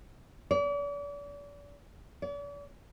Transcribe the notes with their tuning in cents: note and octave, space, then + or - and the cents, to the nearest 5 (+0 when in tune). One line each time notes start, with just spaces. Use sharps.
D5 -40
D5 -45